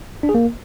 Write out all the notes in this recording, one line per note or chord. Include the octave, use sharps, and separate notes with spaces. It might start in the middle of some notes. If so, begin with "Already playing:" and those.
D4
G#4
A#3